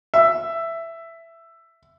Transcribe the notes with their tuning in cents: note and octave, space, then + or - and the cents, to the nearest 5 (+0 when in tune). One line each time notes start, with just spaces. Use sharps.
E5 +10